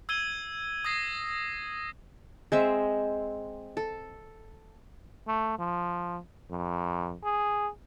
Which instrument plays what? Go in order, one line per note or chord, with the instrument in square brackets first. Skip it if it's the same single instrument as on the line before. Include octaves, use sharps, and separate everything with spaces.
[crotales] E6 G#6 D#7 G7
D#6 G#6 A#6 C7
[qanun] G#3 C4 E5
A4
[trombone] A3
F3
F2
G#4